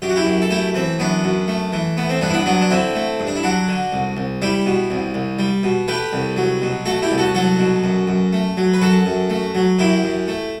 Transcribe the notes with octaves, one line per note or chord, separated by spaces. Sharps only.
F#2 G4
F#4
E4 G4
F#2
A4
A3 E4 G4
E3 C4
F#2 B3 D4
F#2
A3
E3
A3 B3
C4
G2 B3 D4
E4
B3 D4
F#3 B3 D4
D4
D3 C4 E4
A3
G2
D4
E4
F#3 D4 F#4
D3
C2
C2
G3 E4 G4
B2
C2
C2
G3
B2
A3 G4 B4
C2
F#3
B2
A3 F#4 A4
E4 G4
C2
F#4 A4
F#3 F#4 A4
B2
F#2
F#2
A3
F#3
B4
F#2 F#4 A4
F#2
A3
F#3
F#2 E4 G4
F#2
A3